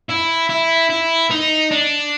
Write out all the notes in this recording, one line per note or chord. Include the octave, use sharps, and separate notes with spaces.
E4
E4
E4
D#4
D4